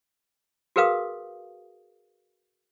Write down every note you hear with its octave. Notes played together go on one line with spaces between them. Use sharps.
F#4 G#4 A#4 B4 F5 D#6